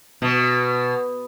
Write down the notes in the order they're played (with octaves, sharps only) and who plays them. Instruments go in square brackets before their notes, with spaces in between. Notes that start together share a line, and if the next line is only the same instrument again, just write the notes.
[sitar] B2